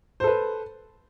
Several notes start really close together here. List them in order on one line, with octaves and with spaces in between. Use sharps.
C5 A4 B4